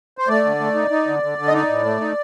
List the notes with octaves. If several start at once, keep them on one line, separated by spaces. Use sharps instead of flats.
C5
A3 D5
D3
A3
D#4
D#4
D3
D3
D3
D#5
D#4 D5
A2
A3
D#4